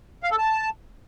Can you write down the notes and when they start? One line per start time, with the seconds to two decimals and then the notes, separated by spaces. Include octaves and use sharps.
0.23 F5
0.31 A4
0.38 A5